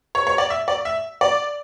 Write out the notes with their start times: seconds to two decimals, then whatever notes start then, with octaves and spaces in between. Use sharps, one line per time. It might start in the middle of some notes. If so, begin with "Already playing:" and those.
0.15 C#5
0.27 C#5
0.38 D5
0.50 E5
0.68 D5
0.85 E5
1.21 D5